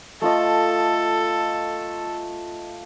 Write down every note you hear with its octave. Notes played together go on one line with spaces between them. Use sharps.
A3 F4 A4 D#5